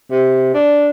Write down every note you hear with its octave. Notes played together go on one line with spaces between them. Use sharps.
C3
D4